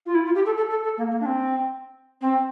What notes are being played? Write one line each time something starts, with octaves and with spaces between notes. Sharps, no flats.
F4
E4
F4
G4
A4
A4
A4
A4
A#3
A#3
D4
C4
C4